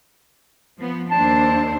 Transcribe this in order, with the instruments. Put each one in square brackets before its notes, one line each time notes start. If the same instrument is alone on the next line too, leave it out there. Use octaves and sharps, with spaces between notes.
[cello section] F3 B3
[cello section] D#2 D4 C5 [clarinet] A5